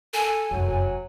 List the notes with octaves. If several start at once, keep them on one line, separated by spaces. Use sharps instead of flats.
A4 G#5
F1 F#2 F#3